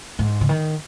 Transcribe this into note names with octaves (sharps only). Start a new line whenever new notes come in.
G#2
C#3
D#3